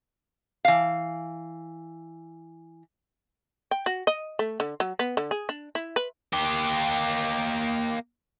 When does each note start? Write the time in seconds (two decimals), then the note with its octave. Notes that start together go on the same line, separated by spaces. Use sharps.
0.65 E3 F5
3.71 G5
3.86 F#4
4.07 D#5
4.39 A3
4.60 D3
4.80 F#3
4.99 B3
5.17 D3
5.31 G#4
5.49 D4
5.75 E4
5.96 B4
6.33 A#3 G4